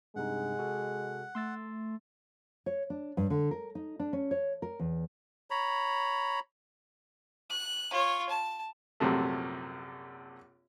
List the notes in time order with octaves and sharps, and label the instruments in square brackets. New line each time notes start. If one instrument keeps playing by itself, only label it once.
[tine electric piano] G2 C3 D#4 [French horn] G#3 [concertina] F#5
[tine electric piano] C3 F#4 A4
[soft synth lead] A3 [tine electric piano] C6 E6 A6
[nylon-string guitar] C#5
D4
G2
D3
A#4
D#4
D4
C#4
C#5
A#4
E2
[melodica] C#5 A#5 B5
[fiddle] F#6
F4 C#5
A5
[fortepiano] A#1 F#2 C3 A3